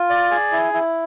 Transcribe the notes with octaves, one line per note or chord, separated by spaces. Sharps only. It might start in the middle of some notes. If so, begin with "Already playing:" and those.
Already playing: F4
D5
G#4
E4
E4